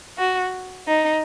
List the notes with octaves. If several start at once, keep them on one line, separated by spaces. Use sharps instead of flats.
F#4
D#4